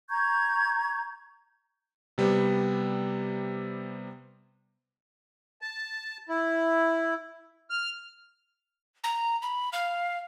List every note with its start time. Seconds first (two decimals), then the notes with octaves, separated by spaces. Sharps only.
0.10 A#5 C#6 G6 G#6
2.18 C3 G3 B3
5.62 A5
6.29 E4
7.70 F6
9.04 A#5
9.42 B5
9.73 F5